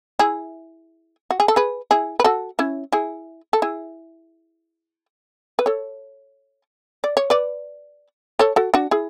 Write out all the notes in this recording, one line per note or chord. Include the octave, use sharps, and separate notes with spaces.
E4 G#4
F#4
G#4
A4
G#4 B4
E4 G#4
B4
F#4 A4
C#4 E4
E4 G#4
A4
E4 G#4
B4
A4 C#5
D5
C#5
B4 D5
A4 C#5
F#4 A4
D4 F#4
E4 G#4